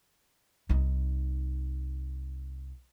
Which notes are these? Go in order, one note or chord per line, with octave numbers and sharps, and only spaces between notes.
C2 D#4